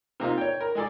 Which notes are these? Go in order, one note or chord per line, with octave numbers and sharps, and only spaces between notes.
C3 A#3 D#4 F4
C#5 G5
A#4
G#3 G#4 A4 D5